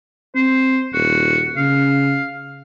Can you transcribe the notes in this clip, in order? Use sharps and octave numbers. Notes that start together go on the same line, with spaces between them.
C4 C5
D#1 F#4
C#3 F5